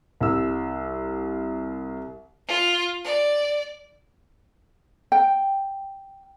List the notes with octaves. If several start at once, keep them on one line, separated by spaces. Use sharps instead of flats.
C2 E6
F4
D5
G5